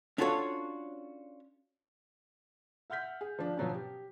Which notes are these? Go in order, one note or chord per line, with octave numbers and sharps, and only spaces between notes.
C#4 D4 F4 F#4 A4 C#5
E5 F#5 F6 G6 B6
G#4
F3 D4
B2 F3 F#3 B3 C#4
G4